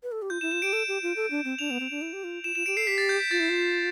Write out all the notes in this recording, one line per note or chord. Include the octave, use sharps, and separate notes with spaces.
B4
A4
G4
F4 G6
E4 E7
F4 E7
G4 D7
A4 E7
G4
F4
A4
D4
C4
D4 F7
B3
C4
D4
E4
G4
F4
F4 E7
F4 E7
G4 D7
A4 C7
G4 B6
A6
G6
B6
F4 A6
E4
F4